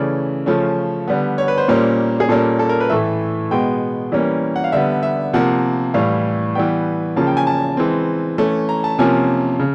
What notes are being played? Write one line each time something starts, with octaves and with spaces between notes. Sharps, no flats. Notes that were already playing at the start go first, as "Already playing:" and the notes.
Already playing: C#3 E3 A3 C#4 D5
C#3 F3 A3 C#4 C#5
D3 G3 B3
C#5
B4
C5
A#2 G3 A#3 C#4
G#4
A#2 G3 A#3 C#4 A4
A4
A#4
B4
A2 E3 A3 E5
B2 G#3 B3 G5
E3 G3 A#3 C#4
F#5
F5
D3 G3 B3 E5
E5
C3 F3 A#3 F#5
A2 E3 G3 F5
E3 G3 B3 G5
C#3 F3 A#3 C#4 A5
G5
G#5
A5
E3 G#3 C4
E3 A3 C#4
A#5
A5
C3 F3 A#3 C#4 G#5
C#3